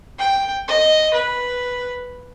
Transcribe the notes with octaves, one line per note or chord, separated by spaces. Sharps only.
G5
D#5
B4